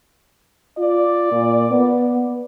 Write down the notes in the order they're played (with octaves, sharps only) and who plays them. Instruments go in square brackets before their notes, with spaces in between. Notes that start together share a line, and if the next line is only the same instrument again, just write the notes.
[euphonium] F4 [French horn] D5
[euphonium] A#2
B3